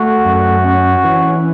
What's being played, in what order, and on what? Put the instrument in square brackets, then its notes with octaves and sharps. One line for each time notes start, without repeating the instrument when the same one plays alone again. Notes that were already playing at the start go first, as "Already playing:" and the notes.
Already playing: [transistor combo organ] A3 [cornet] F#4
[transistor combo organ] F#2
C#4
E3